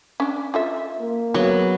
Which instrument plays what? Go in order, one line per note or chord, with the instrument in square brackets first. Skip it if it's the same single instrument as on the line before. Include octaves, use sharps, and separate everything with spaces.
[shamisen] C#4 D4
F4 A4 E5
[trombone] A#3
[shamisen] C#3 [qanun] F#3 B3 F#4